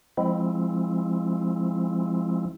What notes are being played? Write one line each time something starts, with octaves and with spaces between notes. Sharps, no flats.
F3 G#3 C4 E4